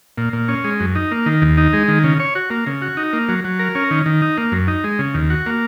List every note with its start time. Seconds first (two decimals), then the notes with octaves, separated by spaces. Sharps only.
0.18 A#2
0.33 A#2
0.48 C#4
0.64 G#3
0.80 F#2
0.95 D#4
1.11 A#3
1.26 D#3
1.42 D#2
1.57 D#4
1.73 G#3
1.88 D#3
2.04 C#3
2.20 C#5
2.35 F#4
2.50 A#3
2.67 C#3
2.82 F#4
2.97 D#4
3.13 A#3
3.29 F#3
3.44 F#3
3.59 A#4
3.75 C#4
3.91 D#3
4.06 D#3
4.22 D#4
4.38 A#3
4.52 F#2
4.68 D#4
4.84 G#3
4.99 C#3
5.14 D#2
5.30 F#4
5.46 A#3